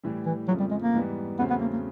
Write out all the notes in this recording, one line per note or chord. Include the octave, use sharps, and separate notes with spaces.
A2 E3 G3
E3
F2 C#3 F3 F#3 A3
G3
G#3
A#3
G#2 E3 G3 B3
E2 C#3 F#3 A3 B3 C4
B3
A#3
A#3